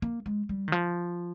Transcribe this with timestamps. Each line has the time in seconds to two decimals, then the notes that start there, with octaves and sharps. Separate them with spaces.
0.02 A#3
0.26 G#3
0.49 G3
0.68 D#3
0.72 F3